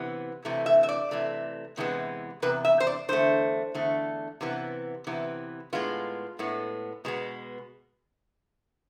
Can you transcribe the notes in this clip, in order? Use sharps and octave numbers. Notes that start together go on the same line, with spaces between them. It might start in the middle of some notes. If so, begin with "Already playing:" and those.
Already playing: C3 E3 B3
C3 E3 A3
E5
E5
D5
C3 E3 A3
E2 C3 E3 G#3 B3
E2 C3 B4
E5
C5
D5
E2 D3 A3 C5
E2 D3 A3
C3 E3 B3
C3 E3 B3
A2 G#3 B3 F4
A2 G#3 B3
B2 G#3 B3